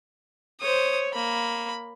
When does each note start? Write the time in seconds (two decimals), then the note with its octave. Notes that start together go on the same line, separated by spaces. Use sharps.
0.61 C5 C#5 D#6
1.14 A#3 B5